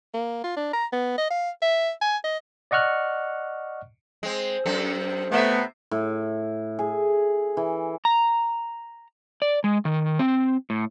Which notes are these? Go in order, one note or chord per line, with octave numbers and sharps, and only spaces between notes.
A#3
F4
D4
A#5
B3
D#5
F5
E5
G#5
D#5
D5 D#5 F#5 C#6 F6 F#6
G#3 C4
F#2 C4 A4
C3 A3 B3 A#4 E5
A2
G#4
E3
A#5
D5
G#3
D#3
C4
A2